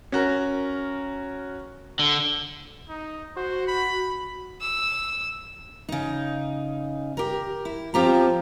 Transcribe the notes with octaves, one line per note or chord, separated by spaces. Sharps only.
C#4 F#4 A#4
D3
D#4
F#4 C5
B5
E6
C#3 D#4
G4 A#4
E4
F3 C4 G4 A#5